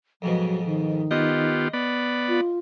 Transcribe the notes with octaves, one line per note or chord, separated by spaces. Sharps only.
F2 G#2 B2 F#3
D#3
B3 F4 G4 D#5
B3 D5 B5
F4